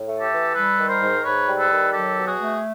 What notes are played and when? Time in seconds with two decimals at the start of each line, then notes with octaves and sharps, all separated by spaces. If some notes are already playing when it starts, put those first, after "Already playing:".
Already playing: A2
0.08 A3
0.20 G4 A4
0.31 E3
0.55 G3 A4 B4
0.77 D#3
0.89 A#4 C5
1.01 G#2
1.23 G#2 B4 C#5
1.47 G3
1.59 A4 B4
1.70 D#3
1.92 F#3 G4 A4
2.15 B2
2.27 F#4 G#4
2.39 A3